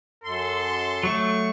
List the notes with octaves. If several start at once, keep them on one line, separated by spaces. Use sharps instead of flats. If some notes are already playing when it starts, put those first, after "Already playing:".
F#2 A4 C6
F#3 A3 C#6